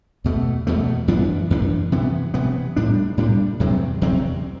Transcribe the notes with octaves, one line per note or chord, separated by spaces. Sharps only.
E2 B2 A3
E2 B2 A3
F#2 E3 B3 D4
F#2 E3 B3 D4
C3 E3 B3
C3 E3 B3
A2 G3 D4
A2 G3 D4
E2 C3 F#3 C4
E2 C3 F#3 C4